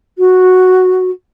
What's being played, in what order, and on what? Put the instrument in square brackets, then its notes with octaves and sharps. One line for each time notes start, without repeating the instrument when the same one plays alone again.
[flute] F#4